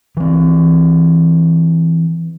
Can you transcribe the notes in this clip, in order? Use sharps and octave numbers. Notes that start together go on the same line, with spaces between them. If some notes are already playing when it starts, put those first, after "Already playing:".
E3 C4